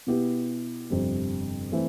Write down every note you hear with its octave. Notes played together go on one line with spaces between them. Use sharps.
B2 B3 E4 G4
G1 F2 C3 G3 C4
E3 A3 C4